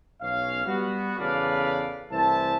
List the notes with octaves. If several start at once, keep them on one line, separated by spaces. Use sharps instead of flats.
B1 C#4 F5
G3 B3 F#4
E2 C#3 A4 B4 D5 F5
C2 E3 A3 C5 E5 A5